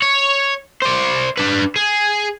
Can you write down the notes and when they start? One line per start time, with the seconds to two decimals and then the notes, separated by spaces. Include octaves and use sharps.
0.02 C#5
0.82 C5 D5
1.37 D4 B4
1.76 G#4